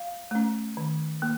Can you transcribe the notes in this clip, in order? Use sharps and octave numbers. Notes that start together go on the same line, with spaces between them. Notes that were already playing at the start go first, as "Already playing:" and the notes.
Already playing: F5
A3 C#4
D#3
A#3